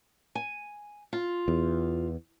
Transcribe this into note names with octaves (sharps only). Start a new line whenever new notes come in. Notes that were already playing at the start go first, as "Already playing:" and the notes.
G#5
F4
E2